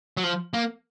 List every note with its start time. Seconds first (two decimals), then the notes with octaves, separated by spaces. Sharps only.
0.17 F#3
0.23 F3
0.54 A#3